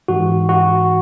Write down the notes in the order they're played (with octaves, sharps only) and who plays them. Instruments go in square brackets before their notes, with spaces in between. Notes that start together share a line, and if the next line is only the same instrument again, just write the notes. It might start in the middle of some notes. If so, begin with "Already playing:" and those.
[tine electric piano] G#2 E3 F#4
F#4